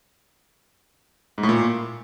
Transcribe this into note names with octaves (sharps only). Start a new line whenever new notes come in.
G#2
A2
A#2